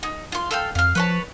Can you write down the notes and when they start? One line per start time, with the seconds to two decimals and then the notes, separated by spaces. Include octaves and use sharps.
0.03 D#4
0.32 F4 C6
0.51 A4 F5 G5
0.75 F2 F5 F6
0.95 F3 B4 C#5 A5